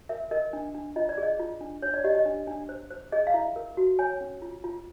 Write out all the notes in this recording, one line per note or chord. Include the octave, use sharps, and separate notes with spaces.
A#4 E5
A#4 D#5
D4
D4
F4 D#5
D5
G#4
D#5
F4
D4
D4 C#5
D5
G4 D#5
D#5
D4
D4
C5
C5
G#4 D#5
F5
E4 E5
A#4
F#4
C#5 G#5
C#4
F4
F4